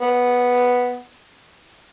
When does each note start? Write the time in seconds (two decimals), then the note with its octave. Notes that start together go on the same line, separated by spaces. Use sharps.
0.01 B3